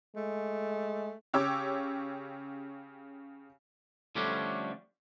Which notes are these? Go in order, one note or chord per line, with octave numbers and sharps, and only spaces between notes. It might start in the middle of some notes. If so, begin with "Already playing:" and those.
G#3 A3
C#3 G4 C#5 D6 E6
D3 F3 G3 A3 C#4 D4